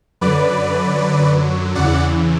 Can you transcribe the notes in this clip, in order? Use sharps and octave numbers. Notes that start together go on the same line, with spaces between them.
F#2 D3 F#3 B4 D5
E2 C#3 E3 D5 F#5